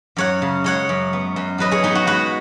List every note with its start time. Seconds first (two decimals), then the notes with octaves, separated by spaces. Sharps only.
0.17 F#2 C#5 F#5
0.42 C#3
0.64 G#3 C#5 F#5
0.89 F#2
1.13 B3
1.36 F#2
1.58 F#3 B4 D#5
1.71 G#4 C#5
1.83 B3 D#4 G#4
1.95 F#4
2.07 G#3 F#4 B4